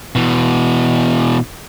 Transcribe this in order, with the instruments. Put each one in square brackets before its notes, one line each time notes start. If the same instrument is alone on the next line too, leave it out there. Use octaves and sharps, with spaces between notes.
[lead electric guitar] B2 E3